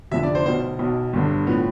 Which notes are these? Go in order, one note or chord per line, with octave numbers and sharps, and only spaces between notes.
F1 F2 D3 E5
D5
C5
B1 B2 C5
B1 B2
G1 G2 D3
A2 F3 B3